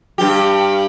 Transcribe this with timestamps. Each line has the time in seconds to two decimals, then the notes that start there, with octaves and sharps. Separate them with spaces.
0.18 G2 G4